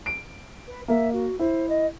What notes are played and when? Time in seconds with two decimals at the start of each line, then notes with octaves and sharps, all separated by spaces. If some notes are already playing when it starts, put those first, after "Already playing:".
0.06 D7
0.67 B4
0.88 A#3 A#4 E5
1.13 F#4
1.39 E4 C5
1.69 D#5